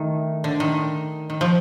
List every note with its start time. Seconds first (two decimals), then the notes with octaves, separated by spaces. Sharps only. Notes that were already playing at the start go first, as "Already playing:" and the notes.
Already playing: D#3 A3
0.44 D3
0.60 D#3
1.30 D#3
1.41 F3